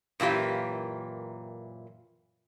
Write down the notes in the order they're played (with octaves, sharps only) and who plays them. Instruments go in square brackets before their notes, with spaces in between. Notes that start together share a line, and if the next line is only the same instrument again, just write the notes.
[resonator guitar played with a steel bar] F#2 A#2 E3 G4 F5